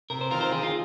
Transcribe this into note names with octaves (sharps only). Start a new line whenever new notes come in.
C3 A#4
C5
D#3 C4 F4 A#4
C5
D#3 G#4
F4